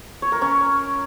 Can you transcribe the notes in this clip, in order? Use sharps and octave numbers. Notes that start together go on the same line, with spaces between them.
C#5
A#4
C#4